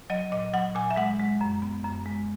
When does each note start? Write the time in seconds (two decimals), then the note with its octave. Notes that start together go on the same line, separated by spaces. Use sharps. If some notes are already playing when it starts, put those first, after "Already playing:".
0.10 F#3 D#5
0.32 A#2 D#5
0.53 F#3 F#5
0.75 A#2 G#5
0.91 E5
0.96 G#3 F#5
1.19 G#3
1.41 F#2
1.62 B3
1.84 F#2
2.06 G#3